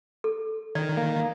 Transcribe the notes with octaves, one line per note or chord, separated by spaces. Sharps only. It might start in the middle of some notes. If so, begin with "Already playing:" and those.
A4
D#3 D5
A#3